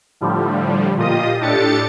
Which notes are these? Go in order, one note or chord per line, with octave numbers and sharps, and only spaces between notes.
A2 D3 F3 G3
A#2 F4 G4 D#5 D#6
A2 D4 G4 A4 A6 C#7